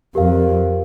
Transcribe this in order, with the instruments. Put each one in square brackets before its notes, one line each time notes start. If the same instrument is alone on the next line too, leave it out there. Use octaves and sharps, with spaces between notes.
[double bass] F2 [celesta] G4 A#4 F5